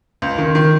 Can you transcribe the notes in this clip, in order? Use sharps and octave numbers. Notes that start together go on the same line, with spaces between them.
C#2
D#3
D#3